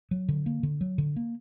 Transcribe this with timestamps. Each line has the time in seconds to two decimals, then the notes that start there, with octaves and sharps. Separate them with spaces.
0.11 F#3
0.29 D3
0.46 A#3
0.63 D3
0.81 F#3
0.98 D3
1.16 A#3